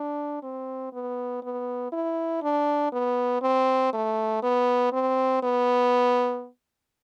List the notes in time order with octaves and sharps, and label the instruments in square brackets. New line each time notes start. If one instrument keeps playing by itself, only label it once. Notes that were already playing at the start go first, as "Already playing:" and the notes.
Already playing: [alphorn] D4
C4
B3
B3
E4
D4
B3
C4
A3
B3
C4
B3